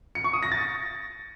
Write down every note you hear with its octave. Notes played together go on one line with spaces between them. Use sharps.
C#7
C#6
D#6
A#6
A6